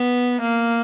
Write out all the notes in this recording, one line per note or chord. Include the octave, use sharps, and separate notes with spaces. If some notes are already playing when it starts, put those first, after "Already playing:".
Already playing: B3
A#3